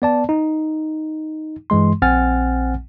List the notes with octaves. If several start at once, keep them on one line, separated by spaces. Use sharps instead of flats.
B3 D5 A5
D#4
G2 E3 G#3 C6
A#1 C4 F#5 G#5 F6 A6